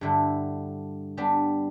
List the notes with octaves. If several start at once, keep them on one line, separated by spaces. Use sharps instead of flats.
G2 D3 A3 E4
G3 B3 D4